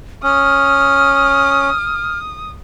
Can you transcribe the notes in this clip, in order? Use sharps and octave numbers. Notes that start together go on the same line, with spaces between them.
C#4 D#6 F6